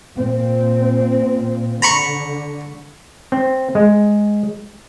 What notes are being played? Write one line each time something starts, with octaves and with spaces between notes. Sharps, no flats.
A#2 C4
D3 A#5 B5 C#6
C4
G#3